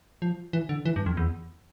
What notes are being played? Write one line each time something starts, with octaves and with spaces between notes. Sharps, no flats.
F3
E3
D3
E3
G2
F2
E2